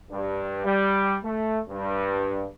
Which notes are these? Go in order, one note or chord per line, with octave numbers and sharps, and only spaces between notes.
G2
G3
A3
G2